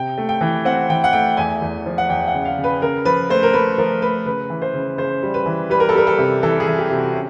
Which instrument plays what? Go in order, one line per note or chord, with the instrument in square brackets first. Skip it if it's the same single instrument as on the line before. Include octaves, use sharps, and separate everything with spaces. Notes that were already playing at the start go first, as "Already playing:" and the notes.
Already playing: [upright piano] C3 G5
A3
G5
E3
C4 F#5
E3 G5
F#5
A3 G5
E2 G#5
E2
F3
F#5
E2 G5
F#5
C#3
F5
C#3
B4
C#3 A#4
F3 B4
A3 C5
A#4
A3 B4
F3 A#4
A3 B4
C#3 B4
E3
C5
C#3
C#3 C5
G3
B4
E3
G3 B4
A#4
A4
G3 A#4
A4
C3
E3 A4
G#4
E3
G4
C3
F#4
C#4